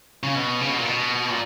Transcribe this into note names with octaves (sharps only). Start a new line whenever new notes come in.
C#3
B2
C#3
B2
A#2
B2
A#2